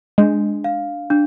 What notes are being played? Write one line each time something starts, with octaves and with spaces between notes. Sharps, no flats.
G#3 D4
F5
D4